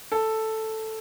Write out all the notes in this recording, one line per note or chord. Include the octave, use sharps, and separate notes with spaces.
A4